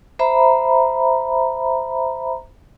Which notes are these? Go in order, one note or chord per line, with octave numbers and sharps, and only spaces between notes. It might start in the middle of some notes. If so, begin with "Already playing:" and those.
C5 E5 A#5 B5